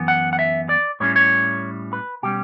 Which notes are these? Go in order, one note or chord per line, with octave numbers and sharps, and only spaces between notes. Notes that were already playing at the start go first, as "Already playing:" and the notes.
Already playing: F#2 E3 B3
F#5
F#5
E5
D5
A2 G3 C#4 C#5
C#5
B4
B2 G3 C#4 G4